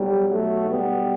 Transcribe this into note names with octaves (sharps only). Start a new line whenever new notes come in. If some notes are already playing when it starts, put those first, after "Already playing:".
Already playing: B1 B2 F#3 G3
F#3 A3
G3 B3